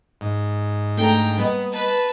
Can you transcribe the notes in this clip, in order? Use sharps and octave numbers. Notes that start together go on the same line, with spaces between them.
G#2
A3 D4 A4 G5 A#5
G3 A#3 B3 D#5
B4 A5